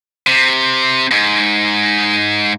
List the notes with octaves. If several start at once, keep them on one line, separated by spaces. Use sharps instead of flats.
C3
G#2